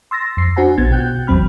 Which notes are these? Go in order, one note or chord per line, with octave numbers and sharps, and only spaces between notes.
C6 E6 A6 A#6
F2 C7
D4 F#4 C5 F#5 G#5 A#5
A#1 B3 G#6 A6
B2 F#4 G5 F#6 G6
G#1 E2 F#3 C4 B5 F6